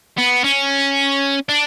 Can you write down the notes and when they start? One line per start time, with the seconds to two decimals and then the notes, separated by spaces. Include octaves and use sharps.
0.18 B3
0.44 C#4
1.49 D4